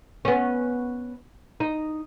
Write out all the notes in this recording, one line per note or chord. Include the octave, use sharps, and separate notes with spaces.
B3 C#4
D#4